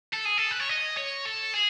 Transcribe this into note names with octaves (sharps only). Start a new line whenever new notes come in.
A4
G#4
A4
B4
C#5
D#5
C#5
A4
G#4